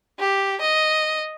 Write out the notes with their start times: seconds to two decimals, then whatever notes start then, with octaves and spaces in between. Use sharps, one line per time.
0.19 G4
0.61 D#5